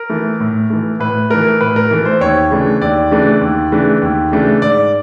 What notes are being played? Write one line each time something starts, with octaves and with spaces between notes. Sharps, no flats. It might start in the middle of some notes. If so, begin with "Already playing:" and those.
Already playing: A#4
E3 A3
A2
E3 A3
A2 B4
E3 A3 A#4
A2 B4
A#4
E3 A3
C5
D#2 C#5
C#3 E3 A3 D4
D#2 D5
C#3 E3 A3 D4
D#2
C#3 E3 A3 D4
D#2
C#3 E3 A3 D4
G#2 D5